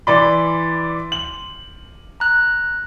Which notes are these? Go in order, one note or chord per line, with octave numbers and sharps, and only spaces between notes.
E3 D5 B5 C6
F#7
A#5 F#6